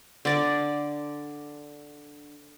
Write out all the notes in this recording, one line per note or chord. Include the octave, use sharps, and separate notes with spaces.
D3 D5 D6